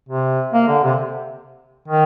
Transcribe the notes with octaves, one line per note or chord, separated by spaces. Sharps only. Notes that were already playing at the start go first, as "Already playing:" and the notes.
C3
A#3
D3
C3
D#3